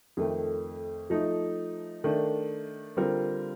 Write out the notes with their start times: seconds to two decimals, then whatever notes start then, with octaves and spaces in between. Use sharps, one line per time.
0.17 F2 D#3 A3
1.10 F3 A3 D#4
2.04 D#3 A3 D4
2.97 D3 G3 C4 F4 A#4